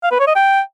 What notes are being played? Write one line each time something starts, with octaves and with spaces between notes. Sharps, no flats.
F5
B4
C#5
D#5
G5